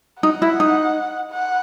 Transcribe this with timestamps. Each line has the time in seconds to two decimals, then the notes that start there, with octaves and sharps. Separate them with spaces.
0.22 D#4 F#5
0.42 E4
0.60 D#4
1.31 F#5